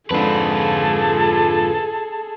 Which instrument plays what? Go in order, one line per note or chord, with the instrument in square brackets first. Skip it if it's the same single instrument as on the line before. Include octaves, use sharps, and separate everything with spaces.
[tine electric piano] F2 G#2 D3 [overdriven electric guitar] F4 B4 [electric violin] G#4 A4 [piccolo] A5